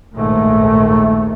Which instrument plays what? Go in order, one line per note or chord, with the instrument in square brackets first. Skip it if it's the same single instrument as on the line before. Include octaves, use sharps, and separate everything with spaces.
[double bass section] A#1 D#2 G#2 [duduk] A3